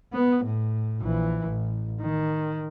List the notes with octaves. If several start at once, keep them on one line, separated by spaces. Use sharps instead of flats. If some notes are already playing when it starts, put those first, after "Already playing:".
B3
A2
A#1 E3
A1
D#3